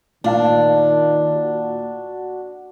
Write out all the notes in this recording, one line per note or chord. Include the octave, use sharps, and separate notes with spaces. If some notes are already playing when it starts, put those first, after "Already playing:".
A#2 D#3 D4 F5 A5
F#4